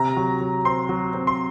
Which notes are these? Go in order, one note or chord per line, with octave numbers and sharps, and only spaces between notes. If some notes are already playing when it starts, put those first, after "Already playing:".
Already playing: C3 A#5
F#3
F#3
C4 C6
F#3
C4
C6